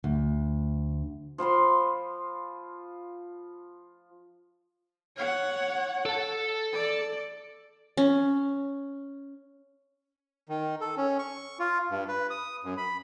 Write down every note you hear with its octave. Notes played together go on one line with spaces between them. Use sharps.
D2
F3 F4 B5 C6
C#5 F#5
A4 A5
D5
C#4
D#3
A4
C#4
C#6
F4
G2
B4
D#6
F#2
B5